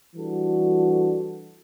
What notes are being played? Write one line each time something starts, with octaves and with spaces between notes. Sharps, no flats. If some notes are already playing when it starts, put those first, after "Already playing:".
E3 G3 D4 F#4 A4